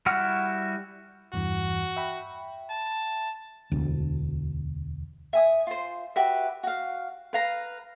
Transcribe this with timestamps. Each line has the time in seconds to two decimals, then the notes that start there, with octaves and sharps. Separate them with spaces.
0.06 G3 E4 F#4 F#5 F6
1.33 E2 G2 E3 F#4
1.96 E5 G5 B5
2.70 A5
3.71 E1 D2
5.33 E5 G#5 D#6
5.67 F4 C5
6.16 F#4 G4 B4 E5
6.63 F#4 F5
7.33 B4 F5 A#5